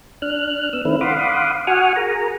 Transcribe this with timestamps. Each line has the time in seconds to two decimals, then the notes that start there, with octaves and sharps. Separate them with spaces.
0.22 D4 F6 F#6
0.73 B3 E6
0.85 D#3 A3 C4 D4 E4 B4
1.01 F5 F#5 B5 C6 D6 D#6
1.67 F#4 F#5 G#5 C#6 D#6 F6
1.96 G#4 A#4 A#5